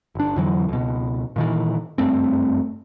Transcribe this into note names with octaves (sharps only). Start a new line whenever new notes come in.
G1 D4
F2 D3 E3 F#3
C#2 B2
A#2 D#3 E3
F#1 G2 A3 C4